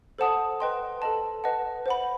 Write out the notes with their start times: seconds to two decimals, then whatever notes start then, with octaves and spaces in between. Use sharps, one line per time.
0.18 A4 C5 F#5 A5 D#6
0.60 B4 D#5 G5 C6
1.02 A4 D#5 A5
1.44 B4 D#5 F#5 A5
1.86 C5 F#5 B5